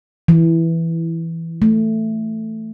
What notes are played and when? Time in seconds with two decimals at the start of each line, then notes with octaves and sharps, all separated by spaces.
0.28 E3
1.62 A3